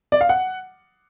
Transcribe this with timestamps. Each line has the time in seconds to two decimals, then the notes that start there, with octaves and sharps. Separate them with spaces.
0.12 D5
0.21 F5
0.29 F#5